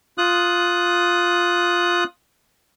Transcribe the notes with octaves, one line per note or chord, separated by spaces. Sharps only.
F4 D#6 F#6